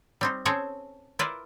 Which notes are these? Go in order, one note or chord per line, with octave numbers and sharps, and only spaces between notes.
G3 C4 D#4
C4 C#4 G#4 A4 C#5 A#5
E4 F4 A#4 B4 D5